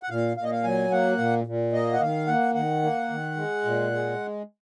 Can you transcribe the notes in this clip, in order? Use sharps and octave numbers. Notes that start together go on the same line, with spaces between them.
F#5
A#2 F5
A#2 F5
D#5
F5
F#3 G#5
A#3 F#5
A#2
A#2
A#3 D#5
F#5
D#3 F5
A#3 F#5
D#3 F#5
A#3
D#3
G#3
A#2
G#3